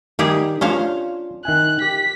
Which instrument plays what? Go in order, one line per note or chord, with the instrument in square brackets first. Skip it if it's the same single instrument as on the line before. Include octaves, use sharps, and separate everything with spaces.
[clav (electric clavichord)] D#3 [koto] G3 G4 G#4
[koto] C#4 C5 F5 [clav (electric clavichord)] D4 F4
[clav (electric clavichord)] D#3 E5 G#5 [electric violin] F#6
[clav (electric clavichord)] G4 [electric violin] B6